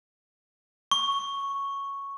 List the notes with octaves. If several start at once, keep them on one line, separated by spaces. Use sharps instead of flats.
C#6